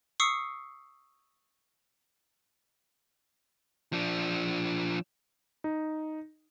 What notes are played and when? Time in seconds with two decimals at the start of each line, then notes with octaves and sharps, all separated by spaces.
0.20 C#6 D#6 E6 C7 C#7
3.93 F3 D4
5.64 D#4